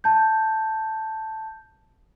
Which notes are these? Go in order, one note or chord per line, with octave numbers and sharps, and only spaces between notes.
A5 G6